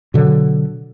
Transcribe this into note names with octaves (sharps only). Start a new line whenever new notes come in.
B2 D3 F#3